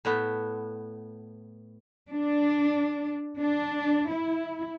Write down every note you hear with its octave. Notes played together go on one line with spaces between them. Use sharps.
A2 A3 B3
D4
D4
E4